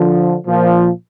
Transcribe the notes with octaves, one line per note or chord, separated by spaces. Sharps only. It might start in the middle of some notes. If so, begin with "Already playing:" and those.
Already playing: D3 F3
A#2 F3